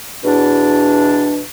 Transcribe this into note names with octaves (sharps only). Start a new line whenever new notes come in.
E2 B2 D4